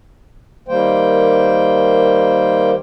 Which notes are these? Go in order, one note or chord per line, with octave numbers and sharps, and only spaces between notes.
D#3 G3 A#3 C5 G5